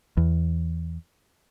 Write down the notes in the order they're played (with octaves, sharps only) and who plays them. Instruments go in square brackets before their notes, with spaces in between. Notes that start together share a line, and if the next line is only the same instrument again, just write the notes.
[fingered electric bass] E2